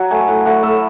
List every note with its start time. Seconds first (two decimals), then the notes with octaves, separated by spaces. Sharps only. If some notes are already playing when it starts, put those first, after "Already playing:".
Already playing: F#3 F#5
0.11 A3 G#5
0.28 A2 F#5
0.45 A3 F#5
0.63 A2 E5